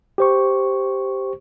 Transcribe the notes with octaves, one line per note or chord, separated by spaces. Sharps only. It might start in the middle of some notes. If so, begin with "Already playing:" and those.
G4 C5 C#6